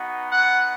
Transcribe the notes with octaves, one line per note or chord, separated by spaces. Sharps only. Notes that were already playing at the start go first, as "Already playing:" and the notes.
Already playing: B3 D#4 F#4
F#5